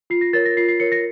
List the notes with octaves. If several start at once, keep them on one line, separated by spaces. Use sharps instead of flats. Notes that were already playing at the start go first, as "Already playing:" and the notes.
F4 C7
A#6
A#4 C#5 A6
A#6
F4 C7
C7
A#4 C#5 C#7
A#6